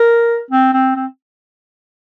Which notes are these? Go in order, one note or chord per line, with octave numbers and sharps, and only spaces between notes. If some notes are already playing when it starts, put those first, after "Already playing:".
Already playing: A#4
C4
C4
C4